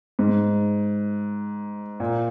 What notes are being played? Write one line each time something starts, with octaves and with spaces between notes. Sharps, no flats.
G#2
A#2